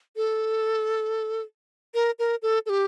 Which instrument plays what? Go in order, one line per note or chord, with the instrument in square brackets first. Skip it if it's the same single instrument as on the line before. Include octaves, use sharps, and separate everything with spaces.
[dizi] A4
A#4
A#4
A4
A4
G4